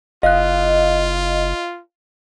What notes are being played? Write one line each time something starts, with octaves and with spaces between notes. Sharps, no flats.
F#1 F4 D#5 F5 F#6